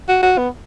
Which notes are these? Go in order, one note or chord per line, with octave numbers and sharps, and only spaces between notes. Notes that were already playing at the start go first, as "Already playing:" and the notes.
F#4
F#4
B3